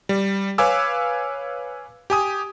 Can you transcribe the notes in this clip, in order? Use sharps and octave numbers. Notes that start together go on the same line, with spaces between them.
G3
B4 C#5 F5 G#5 D6 E6
G4 G#5 D#6